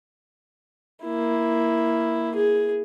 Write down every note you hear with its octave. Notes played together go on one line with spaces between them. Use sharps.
A#3 E4
G#4